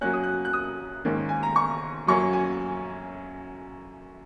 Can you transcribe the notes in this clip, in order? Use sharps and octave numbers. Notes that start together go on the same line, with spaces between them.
F#2 F#3 A#3 C#4 F#6
D#6
F#6
F#6
D#6
G#2 D#3 A#3 C#4
G#5
A#5
C#6
F#2 F#3 A#3 C#4 C#6
G#5